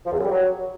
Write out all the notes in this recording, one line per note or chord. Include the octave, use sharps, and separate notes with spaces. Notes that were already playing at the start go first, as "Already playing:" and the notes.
F3
E2
F#2
G3
F#3